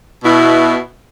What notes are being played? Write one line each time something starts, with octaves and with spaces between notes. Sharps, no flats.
B2 E4